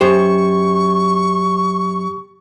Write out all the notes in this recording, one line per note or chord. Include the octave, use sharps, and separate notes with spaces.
F#2 G4 C5 C#6